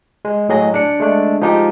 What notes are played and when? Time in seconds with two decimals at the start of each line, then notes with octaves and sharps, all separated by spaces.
0.25 G#3
0.49 A2 F#3 G#4 D#5
0.74 D4 C#7
1.00 G#3 A3 D4
1.41 F3 G#3 D#4 G4